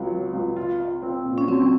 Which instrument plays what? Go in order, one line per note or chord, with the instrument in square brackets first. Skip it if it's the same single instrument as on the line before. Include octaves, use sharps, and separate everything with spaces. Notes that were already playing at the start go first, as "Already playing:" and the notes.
Already playing: [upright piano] C#2 F#3
F#3
C#2
F4
F4
C4
A#2
[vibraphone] C#4
[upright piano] F#3 [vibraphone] C4